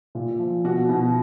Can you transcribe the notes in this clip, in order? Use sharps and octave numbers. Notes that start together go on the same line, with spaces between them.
A#2
F3
B2 F#4
B2